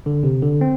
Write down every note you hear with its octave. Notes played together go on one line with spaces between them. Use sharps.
D3
C3
D3
C4